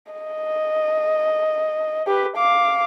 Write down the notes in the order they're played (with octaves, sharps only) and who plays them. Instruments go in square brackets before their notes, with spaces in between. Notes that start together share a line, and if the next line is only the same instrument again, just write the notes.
[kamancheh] D#5
G4 B4
F5 D6